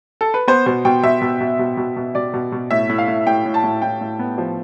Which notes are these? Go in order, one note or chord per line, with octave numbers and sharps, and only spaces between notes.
A4
B4
B3 C5
B2 C5
B2 G5
B2 E5
B2
B2
B2
B2
B2
B2 D5
B2
B2
A2 E5
A2
F5
A2
A2 G5
A2
A5
A2
A2 G5
A2
B3
F3